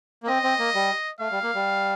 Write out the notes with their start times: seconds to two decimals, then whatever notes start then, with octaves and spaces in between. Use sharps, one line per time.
0.23 A#3
0.28 C4 D#5
0.43 C4
0.59 A#3
0.75 G3
1.20 A3 F5
1.31 G3
1.43 A#3
1.55 G3